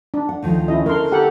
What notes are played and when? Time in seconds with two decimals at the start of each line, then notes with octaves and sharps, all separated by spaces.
0.14 D4
0.29 F#5
0.43 D2 D#3 F3
0.68 C#4 E4 D#5
0.86 D3 A#4 C6
1.12 G4 A4 F#5